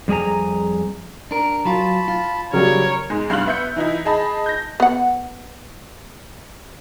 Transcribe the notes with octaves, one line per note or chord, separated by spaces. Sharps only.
F2 G3 G#4 G#5 A#5
D4 A#4
F#3 F4 A5 B5
F4
C#3 F#3 G3 A#4 C#5
G#2 G#3
A1 G2 F5 C6 F#6 F#7
B3 E5 G6 C#7
E3 D#4 E4
G#4 D#5 A5 B5
G6 A#6
B3 F#5